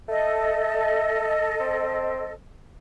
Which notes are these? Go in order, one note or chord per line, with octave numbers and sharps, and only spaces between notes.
A3 A4 D#5
C4